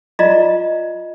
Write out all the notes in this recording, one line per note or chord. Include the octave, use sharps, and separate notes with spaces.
F4 D5 D#5 A#5